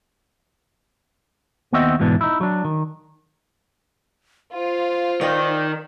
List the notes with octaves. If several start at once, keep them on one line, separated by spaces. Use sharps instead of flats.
D#2 B3 C4 F#4 D#5 E5
E2 G#2 B2 E3 D4
D#4 E4
F#3 D4
D#3
F4 C5
D#3 D5 D#5 G5